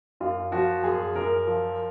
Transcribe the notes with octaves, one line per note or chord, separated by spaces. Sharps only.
F#2 F4
F3 F#4
F#2 G#4
F#2 A#4
F3